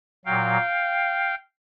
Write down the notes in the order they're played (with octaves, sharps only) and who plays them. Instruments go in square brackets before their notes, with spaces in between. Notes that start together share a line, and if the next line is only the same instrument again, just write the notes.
[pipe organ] A#2 F#3 F5 G5